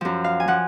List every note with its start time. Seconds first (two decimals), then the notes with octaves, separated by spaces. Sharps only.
0.01 F#2 F3
0.24 F5
0.40 G#5
0.48 F3 F#5